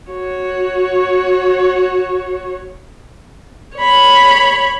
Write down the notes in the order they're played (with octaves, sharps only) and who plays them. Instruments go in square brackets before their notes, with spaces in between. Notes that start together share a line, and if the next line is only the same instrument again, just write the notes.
[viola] F#4 C#5
C#5 B5